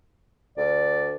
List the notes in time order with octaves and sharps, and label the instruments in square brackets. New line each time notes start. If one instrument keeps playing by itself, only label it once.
[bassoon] D2 [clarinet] D5